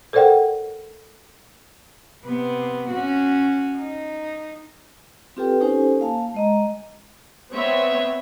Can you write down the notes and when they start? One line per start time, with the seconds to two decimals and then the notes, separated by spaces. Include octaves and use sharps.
0.13 A4 A#4 C5 D5 F#5 G5
2.25 C3 B3
2.90 C#4 F#4
3.78 D#4
5.37 C4 F4 G4 A4 B4 G5
5.61 C#4 D#4 G4 A4 C5 G#5
6.00 A#3 F5 A5
6.34 G#3 D#5 A#5
7.52 B3 C4 C#5 E5